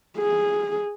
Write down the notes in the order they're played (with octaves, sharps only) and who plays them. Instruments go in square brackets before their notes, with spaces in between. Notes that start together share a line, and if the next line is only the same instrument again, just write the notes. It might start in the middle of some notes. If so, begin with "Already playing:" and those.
[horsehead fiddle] G#4